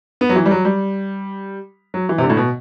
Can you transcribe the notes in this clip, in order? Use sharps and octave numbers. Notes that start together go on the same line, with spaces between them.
B3
F#3
E3
G3
F#3
G3
F#3
E3
C3
D3
A2
B2